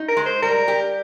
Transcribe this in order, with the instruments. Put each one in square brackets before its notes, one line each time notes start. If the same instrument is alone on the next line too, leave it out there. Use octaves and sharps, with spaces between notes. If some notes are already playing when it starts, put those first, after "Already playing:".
Already playing: [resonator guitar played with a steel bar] D#4
[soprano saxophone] A#4
[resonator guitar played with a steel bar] G#3
[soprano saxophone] C5
[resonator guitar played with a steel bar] G3 [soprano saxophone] A#4
[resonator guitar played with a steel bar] G4